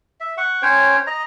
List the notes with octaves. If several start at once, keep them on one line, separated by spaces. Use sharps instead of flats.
E5
F#5 C#6
C#4 C5 C#5 G5
D#5 A#5